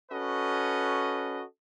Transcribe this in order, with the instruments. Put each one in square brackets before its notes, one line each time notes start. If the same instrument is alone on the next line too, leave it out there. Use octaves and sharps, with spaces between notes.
[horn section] C#4 F#4 A4 B4 D#5